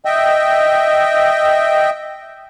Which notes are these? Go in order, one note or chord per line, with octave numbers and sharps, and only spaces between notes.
D#5 E5 G5